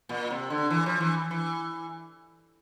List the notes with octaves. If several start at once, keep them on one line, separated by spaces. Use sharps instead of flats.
A#2
C3
D3
E3
F3
E3
E3